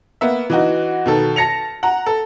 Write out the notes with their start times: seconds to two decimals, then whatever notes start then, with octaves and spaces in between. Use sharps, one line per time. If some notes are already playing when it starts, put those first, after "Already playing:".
0.21 A#3 B3 E5
0.50 E3 D#4 F#4
1.06 B2 D#3 A4
1.36 A5 A#6 C#7 F7
1.83 F#5 A#5
2.06 A4